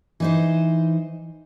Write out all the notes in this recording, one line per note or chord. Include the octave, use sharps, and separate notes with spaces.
E3 D#4 C5